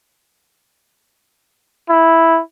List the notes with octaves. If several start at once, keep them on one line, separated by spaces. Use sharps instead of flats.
E4